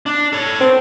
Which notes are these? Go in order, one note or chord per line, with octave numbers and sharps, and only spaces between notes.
D4
A4 C#5
C4